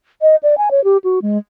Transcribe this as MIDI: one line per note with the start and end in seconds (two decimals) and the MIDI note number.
0.22 0.36 75
0.43 0.57 74
0.58 0.69 80
0.71 0.83 73
0.84 0.98 67
1.04 1.19 66
1.22 1.38 56